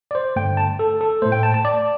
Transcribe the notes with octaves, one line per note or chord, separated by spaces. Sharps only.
D5
C5
G2 D3 A3 G5
A5
A4
A4
A2 A3 C5
G5
A5
A5
D5